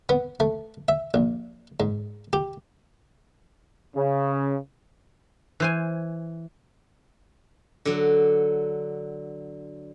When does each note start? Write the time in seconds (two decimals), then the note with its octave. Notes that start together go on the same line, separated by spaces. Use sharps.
0.09 B3
0.40 A3
0.88 E5
1.14 A#1
1.80 G#2
2.33 G4
3.95 C#3
5.60 E3 C5 G#5
7.85 D3 F#3